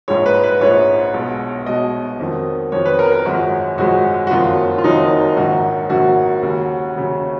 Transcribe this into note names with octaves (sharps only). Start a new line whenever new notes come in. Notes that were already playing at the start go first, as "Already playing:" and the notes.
A#1 G#2 F3 G#3 C#5
B4
B4
A#1 G#2 F3 G#3 C#5
B1 B2 G#3
B1 B2 G#3 D#5
F2 D#3 F#3
F2 D#3 F#3 C#5
B4
A#4
A#4
G#1 F#2 F3 G#3 F#4
G#1 F#2 F3 G#3 F#4
F#4
F#1 F2 D#3 F#3 F4
F4
F#1 F2 D#3 F#3 D#4
A#1 G#2 D#3 F#3 F#4
A#1 G#2 D#3 F#3 F#4
D#2 C#3 F#3
D#2 C#3 F#3